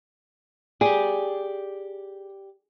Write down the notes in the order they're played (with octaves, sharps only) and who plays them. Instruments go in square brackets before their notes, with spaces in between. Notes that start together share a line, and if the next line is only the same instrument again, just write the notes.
[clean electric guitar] G4 D5 [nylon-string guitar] G#4